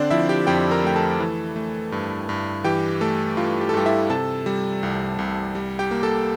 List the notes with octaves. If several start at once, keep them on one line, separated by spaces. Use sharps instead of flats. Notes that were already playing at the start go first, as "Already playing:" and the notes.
Already playing: D3 C4 D4 C5 D5
F3 E4 E5
G4 G5
F2 G4 G5
A#4 A#5
A3 G5
A4 A5
E3
A3
G2
G2
E3 G4 G5
A3 A4
G2 F4
G4
A4
G2 G3 G4
E4 E5
C3 A4 A5
G3
C2
C2
G3
G4 G5
A#3
A4 A5